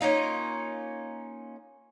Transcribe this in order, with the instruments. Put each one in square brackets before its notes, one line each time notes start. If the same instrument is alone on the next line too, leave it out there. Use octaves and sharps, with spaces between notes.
[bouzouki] A#3 C#4 D#4 F4